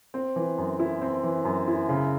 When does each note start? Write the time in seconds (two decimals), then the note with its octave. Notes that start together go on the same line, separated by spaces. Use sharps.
0.14 C4
0.36 E3
0.58 F#2
0.80 E4
1.01 C4
1.23 E3
1.45 F#2
1.68 E4
1.89 C#3